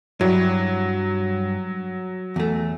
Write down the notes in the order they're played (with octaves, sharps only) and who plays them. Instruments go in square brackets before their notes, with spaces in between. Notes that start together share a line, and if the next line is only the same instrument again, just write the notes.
[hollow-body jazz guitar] G2 E4 [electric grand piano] F#3
[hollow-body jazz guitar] E2 A3